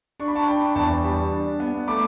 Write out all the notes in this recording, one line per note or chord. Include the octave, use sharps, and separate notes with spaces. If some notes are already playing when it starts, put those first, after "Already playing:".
D4 C#6
B5
A5 C#6
D4 G5 B5
E2 A5 C#6
G3
D4
B3
A3 B5 D6